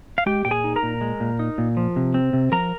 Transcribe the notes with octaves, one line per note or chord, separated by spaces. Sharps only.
F5
G#3 G4 G5
A#2 G5
G#4 G#5
D#4
A#4 A#5
A#2
G#3
A#2
D#4
A#2
F3
C3
C4
C3
F3 A#4 A#5